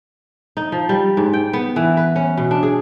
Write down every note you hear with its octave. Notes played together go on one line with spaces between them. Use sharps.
D#4
F3
G3
G#2
G5
B3
E3
B4
C#4
B2
D4
G#4